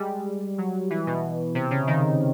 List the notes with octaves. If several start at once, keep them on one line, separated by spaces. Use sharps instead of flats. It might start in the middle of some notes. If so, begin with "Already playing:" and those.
Already playing: G3 G#3
F#3
E3
B2
C3
C#3
D#3